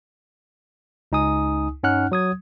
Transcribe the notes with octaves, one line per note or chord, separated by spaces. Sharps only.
C#2 D#4 G#5 D#6
G2 C#4 D#4 F#5 F6 F#6
F#3 D#6 G#6